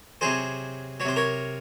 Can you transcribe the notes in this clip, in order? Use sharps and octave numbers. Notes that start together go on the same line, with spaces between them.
C3 F#3 G#4 C5
F#3 C#5
C3 C5
A#4 C#5